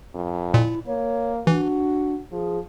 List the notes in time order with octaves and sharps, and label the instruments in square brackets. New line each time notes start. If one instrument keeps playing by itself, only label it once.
[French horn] F2
[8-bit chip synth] A#2 [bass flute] E4
[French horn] A#3 [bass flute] C#5
[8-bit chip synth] E3 [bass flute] D4 [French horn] F#4
[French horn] F3 [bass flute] G#4